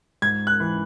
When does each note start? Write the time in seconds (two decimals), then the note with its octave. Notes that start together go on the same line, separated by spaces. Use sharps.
0.22 G#2 G#6
0.47 F#6
0.60 E3